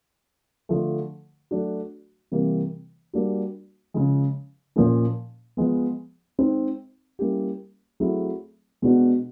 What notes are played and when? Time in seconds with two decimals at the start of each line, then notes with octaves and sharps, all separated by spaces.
0.69 D3 F3 A3
1.51 F#3 A3 D4 F#4
2.31 C3 E3 G3 A#3
3.13 G3 A#3 D4 F#4
3.94 C#3 F3 G#3
4.76 A#2 F3 A#3 C#4
5.57 F3 G#3 B3
6.39 G#3 C4 D#4
7.19 G3 A#3 C#4 E4 G4
8.00 F#3 A3 C4 E4 G#4
8.82 B2 G#3 B3 D4 F#4